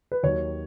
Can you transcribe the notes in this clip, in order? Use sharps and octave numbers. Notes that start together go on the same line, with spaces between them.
B4
D#2 D#3 F#3 C#5